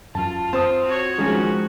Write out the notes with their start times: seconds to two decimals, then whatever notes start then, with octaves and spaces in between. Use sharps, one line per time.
0.15 F#2 F4 A5
0.53 C4 C5 A5 C6 D#6
0.85 F#4 C#5
1.18 D#3 F3 G#3 C#4 F#4